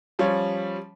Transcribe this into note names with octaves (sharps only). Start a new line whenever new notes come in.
F3 G3 C#4 C#5